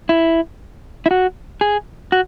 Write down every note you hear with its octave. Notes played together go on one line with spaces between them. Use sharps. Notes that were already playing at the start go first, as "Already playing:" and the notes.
E4
E4
F#4
G#4
F#4